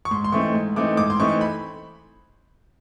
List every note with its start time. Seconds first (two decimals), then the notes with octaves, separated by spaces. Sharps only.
0.05 C#6
0.11 G#2 C6
0.25 C6
0.32 E3 A3 C4 D#4 C#6
0.54 G#2
0.76 E3 A3 C4 D#4 D6
0.97 G#2 D6
1.10 C6
1.20 E3 A3 C4 D#4 C#6
1.41 B5